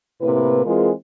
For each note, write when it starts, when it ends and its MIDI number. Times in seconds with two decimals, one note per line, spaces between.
0.21 0.62 45
0.21 0.62 48
0.21 0.62 58
0.21 0.62 64
0.21 0.62 71
0.65 0.90 52
0.65 0.90 56
0.65 0.90 60
0.65 0.90 65
0.65 0.90 68
0.65 0.90 70